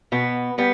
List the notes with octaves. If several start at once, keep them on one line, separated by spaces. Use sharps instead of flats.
B2 B3
G3 B3